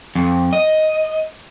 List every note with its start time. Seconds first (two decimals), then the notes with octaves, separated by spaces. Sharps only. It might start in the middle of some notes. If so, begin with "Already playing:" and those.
0.15 F2
0.53 D#5